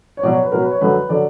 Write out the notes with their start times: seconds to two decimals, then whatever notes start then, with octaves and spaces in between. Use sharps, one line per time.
0.17 C#5
0.23 B2 F#3 D5
0.32 C#5
0.43 B4
0.52 B2 F#3 A#4
0.62 B4
0.71 C#5
0.81 F#2 D3 F#3 B4
1.09 D3 F#3 D5